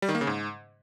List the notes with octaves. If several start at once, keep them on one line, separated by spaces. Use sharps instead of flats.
G3
D#3
A#3
C#3
G#2